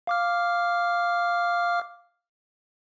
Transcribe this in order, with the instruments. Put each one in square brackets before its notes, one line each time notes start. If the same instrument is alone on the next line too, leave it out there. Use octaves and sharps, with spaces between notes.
[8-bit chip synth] F5 D6 F6